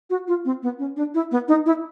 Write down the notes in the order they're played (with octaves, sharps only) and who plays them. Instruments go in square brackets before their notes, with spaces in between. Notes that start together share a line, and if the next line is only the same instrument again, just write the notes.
[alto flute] F#4
F4
C4
B3
C#4
D4
E4
B3
D#4
E4